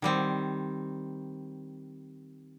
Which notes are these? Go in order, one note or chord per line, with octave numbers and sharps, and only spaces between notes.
D#3 G3 C4